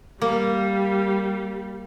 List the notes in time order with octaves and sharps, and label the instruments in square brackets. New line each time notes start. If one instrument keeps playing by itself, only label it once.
[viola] G3 [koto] A#3